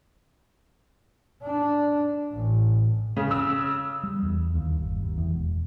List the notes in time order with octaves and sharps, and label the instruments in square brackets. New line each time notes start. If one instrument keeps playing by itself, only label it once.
[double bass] D4
A1
[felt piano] C#3
[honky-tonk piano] E6
[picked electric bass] G3
E2
D#2
G1
D#2
E2
E1